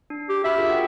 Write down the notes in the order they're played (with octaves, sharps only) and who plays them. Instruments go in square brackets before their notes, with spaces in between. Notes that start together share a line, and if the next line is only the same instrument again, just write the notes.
[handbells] D4
[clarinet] G4
[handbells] F#4 B5 F6 [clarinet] E5
[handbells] F4 G#4 A#4
F#4 F#5 G5